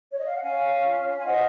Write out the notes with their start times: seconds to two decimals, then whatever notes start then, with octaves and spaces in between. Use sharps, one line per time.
0.11 C#5
0.18 D#5
0.26 F5
0.33 F#5
0.41 C#4 F5 G#5
0.84 F4
1.18 G#5
1.26 C5 D#5 F#5